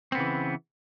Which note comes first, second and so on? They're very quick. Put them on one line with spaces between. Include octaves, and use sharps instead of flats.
C4 B3 C#3 E3